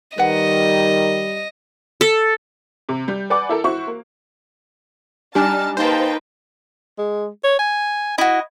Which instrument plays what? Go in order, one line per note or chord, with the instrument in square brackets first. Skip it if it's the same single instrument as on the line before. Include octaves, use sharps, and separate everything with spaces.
[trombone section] D#3 [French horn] G3 [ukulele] B4 F#5 [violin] D#5
[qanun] A4
[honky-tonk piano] C3
G3 G6
B4 D5 F#5 G#5 D6
E4 A4 A#4
E4 F#4 C5 C#6
A#3
[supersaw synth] G3 D4 [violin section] D#4 A5 [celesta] G4 G#5 [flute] F6
[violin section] A#3 B4 G5 [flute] D#4 [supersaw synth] C5 A5
[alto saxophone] G#3
C#5
G#5
[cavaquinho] E4 F#4 [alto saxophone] D#5